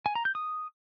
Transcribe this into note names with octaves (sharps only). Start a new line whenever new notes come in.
G#5
A#5
G6
D#6